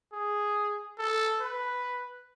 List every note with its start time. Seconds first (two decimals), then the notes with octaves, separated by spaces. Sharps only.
0.13 G#4
0.98 A4
1.40 B4